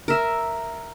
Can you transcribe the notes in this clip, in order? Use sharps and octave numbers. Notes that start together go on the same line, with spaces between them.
A#4 E5